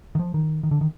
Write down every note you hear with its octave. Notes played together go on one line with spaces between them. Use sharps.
D#3
F3
D#3
D#3
D3
D#3